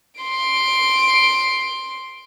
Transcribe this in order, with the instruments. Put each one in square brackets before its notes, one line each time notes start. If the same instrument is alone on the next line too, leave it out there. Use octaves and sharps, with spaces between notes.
[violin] C6 D7